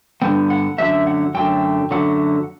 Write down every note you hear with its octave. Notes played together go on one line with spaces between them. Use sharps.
G2 D3 G3 B3 G5
F#5
F#2 D3 F#3 A3 E5
F#5
F#2 D3 F#3 A3 G5
F#2 D3 F#3 A3 F#5